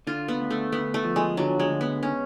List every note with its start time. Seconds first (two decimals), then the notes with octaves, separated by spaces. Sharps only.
0.07 D3 F4
0.28 B3
0.40 D2
0.50 A3
0.72 D2 B3
0.94 A3
1.04 F3
1.16 G#3
1.37 D3 F#3
1.59 G#3
1.69 D2
1.81 B3
2.03 C#4